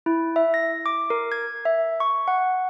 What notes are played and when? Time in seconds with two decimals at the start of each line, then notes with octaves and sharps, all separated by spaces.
0.06 E4
0.36 E5
0.54 A#6
0.86 D6
1.10 A#4
1.32 G#6
1.65 E5
2.00 C#6
2.28 F#5